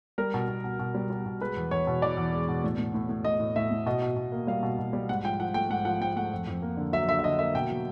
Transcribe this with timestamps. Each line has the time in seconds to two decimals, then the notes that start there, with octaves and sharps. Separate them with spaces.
0.18 G3 A#4
0.34 B2
0.49 B2
0.64 B2
0.79 B2
0.95 G3
1.10 G3
1.26 B2
1.41 G#3 B4
1.56 E2
1.71 E2 C#5
1.87 B2
2.02 E2 D5
2.17 E2
2.33 G#3
2.48 B2
2.64 A2
2.78 A2
2.94 A2
3.09 A2
3.24 A2 D#5
3.40 A2
3.56 A2 E5
3.71 A2
3.86 B2 D#5
4.02 B2
4.16 B2
4.32 A#3
4.47 G3 F5
4.63 B2
4.79 B2
4.93 G3
5.09 G#2 F#5
5.24 F3 G5
5.40 F3 F#5
5.54 A3 G5
5.70 G#2 F#5
5.85 F3 F#5
6.01 G#2 G5
6.16 A3 F#5
6.32 F2
6.47 F2
6.62 A#3
6.77 D3
6.92 F#3 E5
7.08 D3 E5
7.19 E5
7.24 D3 D#5
7.39 A#3 E5
7.54 B2 G5
7.70 F#3